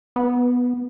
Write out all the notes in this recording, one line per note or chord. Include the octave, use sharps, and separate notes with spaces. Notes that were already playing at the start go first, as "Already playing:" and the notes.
B3